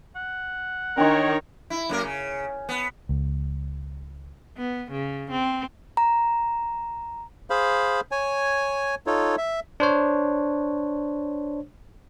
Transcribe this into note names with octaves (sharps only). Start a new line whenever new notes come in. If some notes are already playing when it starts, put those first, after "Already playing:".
F#5
D#3 D4 D#4 A#4 C#5 C6
E4
F#2 A#3 A#4
C#3
B3
C#2
B3
C#3
C4
A#5
G#4 C5 F5 B5
C#5 G#5
D#4 F4 A4 C#5
E5
D4 C5 C#5